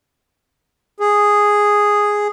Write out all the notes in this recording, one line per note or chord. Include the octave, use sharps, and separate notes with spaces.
G#4